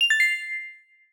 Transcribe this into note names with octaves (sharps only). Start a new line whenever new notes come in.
F7
A6
C7